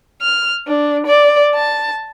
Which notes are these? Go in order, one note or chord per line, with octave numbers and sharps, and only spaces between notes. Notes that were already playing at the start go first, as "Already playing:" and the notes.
F6
D4
D5
A5